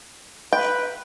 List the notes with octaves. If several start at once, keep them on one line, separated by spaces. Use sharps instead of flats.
B4 G5